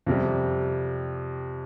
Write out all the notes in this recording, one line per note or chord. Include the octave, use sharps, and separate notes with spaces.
F2 C3 G3